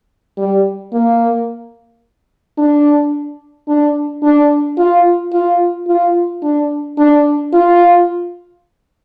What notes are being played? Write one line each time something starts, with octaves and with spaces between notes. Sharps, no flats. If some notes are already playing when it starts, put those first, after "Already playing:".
G3
A#3
D4
D4
D4
F4
F4
F4
D4
D4
F4